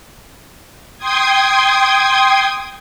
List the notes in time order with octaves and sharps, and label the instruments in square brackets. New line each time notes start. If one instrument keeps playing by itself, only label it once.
[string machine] G5 C6 D#6 G#6